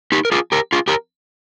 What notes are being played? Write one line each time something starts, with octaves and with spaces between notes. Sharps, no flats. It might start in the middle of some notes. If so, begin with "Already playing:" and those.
D#4 G4
A#4
F4 G#4
G4 A#4
F4 G#4
G4 A#4